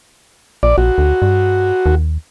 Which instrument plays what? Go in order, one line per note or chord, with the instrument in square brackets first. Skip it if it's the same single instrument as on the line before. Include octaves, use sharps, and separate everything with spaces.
[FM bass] A#1 [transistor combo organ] D5
[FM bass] A#1 [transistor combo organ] F#4
[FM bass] D2
G2
D#2